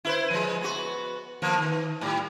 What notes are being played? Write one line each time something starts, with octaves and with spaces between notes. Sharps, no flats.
E4 B4 C5
F3 G#3
B3 F#4
F3 A#3 B3
D#3
A2 G3